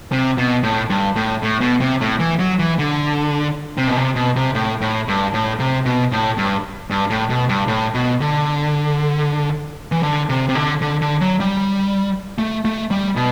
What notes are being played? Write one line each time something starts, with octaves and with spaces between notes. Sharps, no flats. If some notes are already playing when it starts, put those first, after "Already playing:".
C3
B2
A2
G2
A2
A2
B2
C3
A2
E3
F#3
E3
D3
C3
B2
C3
B2
C3
A2
A2
G2
A2
C3
B2
A2
G2
G2
A2
B2
G2
A2
B2
D3
E3
D3
C3
C3
D3
D3
D3
F#3
G3
A3
A3
G3
B2